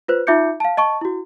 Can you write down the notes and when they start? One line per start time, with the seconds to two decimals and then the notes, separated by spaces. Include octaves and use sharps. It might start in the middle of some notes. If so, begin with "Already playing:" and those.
0.08 F4 B4 C5
0.27 D#4 F4 E5 D6 G6 C#7
0.60 F5 A5
0.77 D#5 A5 C#6
1.01 E4 F#4